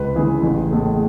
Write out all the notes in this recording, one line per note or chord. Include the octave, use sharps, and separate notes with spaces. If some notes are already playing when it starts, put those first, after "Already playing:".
Already playing: C#2 B4
C#3 E3 G#3 G#4
A1
A2 G#3